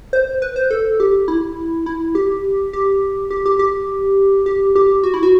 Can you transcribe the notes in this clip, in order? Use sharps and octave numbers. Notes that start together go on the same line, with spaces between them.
C5
B4
C5
A4
G4
E4
E4
G4
G4
G4
G4
G4
G4
G4
F#4
E4
F#4